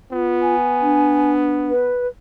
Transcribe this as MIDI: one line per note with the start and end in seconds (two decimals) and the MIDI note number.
0.11 1.94 59
0.11 0.55 65
0.41 1.31 80
0.82 1.71 62
1.70 2.07 71